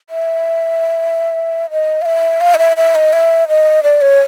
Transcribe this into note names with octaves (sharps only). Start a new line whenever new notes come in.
E5
D#5
F5
E5
F5
D#5
E5
E5
D#5
E5
D#5
D5
C#5